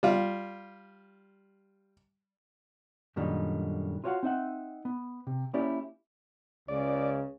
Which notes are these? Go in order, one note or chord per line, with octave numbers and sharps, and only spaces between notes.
G3 F4
F#2 A#2 D3 D#3 G3 D#4
F4 F#4 C#5 D5 F5 F#5
C4 D#4 E5 F#5
B3
C3
A#3 C#4 E4 G4 C#5 D5
C#2 C#3 D5